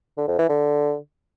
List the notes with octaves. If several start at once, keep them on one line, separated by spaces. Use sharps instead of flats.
D3
F2
E3
D3